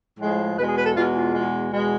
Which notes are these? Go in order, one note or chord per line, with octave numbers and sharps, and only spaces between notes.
A2 F3 G#3
E2 B2 G#3 B4
G#4
B4
A4
E2 B2 G#3 F4
F4
E2 B2 G#3
E2 B2 G#3